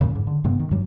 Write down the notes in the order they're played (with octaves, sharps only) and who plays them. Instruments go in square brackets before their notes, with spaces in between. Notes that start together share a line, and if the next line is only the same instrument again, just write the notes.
[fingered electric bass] F#2 A#2 C#3
G#2
D3
G2 C3 B3
D#3
G2 F#3 G3